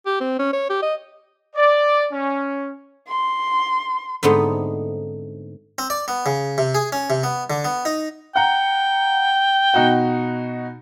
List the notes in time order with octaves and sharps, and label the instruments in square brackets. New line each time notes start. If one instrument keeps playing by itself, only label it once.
[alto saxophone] G4
C4
C#4
C#5
G4
D#5
[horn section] D5
C#4
[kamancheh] C6
[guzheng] G#2 D3 A3 B3 C4 D#4
[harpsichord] C4
D5
B3
C#3
C3
G#4
C#4
C3
B3
D3
B3
D#4
[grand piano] F#5 A#5 [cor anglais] G5
[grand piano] B2 D#4 F#4